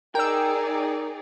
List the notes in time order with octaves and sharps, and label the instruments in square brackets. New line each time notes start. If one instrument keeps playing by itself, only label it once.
[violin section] D#4 G#4 D5 [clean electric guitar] A#4 [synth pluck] G5 E6